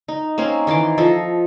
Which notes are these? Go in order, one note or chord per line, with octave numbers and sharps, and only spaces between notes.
D#4
A#3 C4 C#4
D#3 E3 C6 D6
F3 A4 D#5